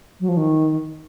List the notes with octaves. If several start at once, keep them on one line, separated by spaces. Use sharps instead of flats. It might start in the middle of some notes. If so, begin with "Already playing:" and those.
F#3
F3
D#3